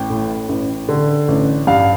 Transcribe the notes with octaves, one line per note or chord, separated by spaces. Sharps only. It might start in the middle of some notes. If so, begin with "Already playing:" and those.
Already playing: A1 G5
A2
A1
D3
A1
G2 F5